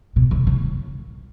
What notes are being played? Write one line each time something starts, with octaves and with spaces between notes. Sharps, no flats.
B2
C#3
C#3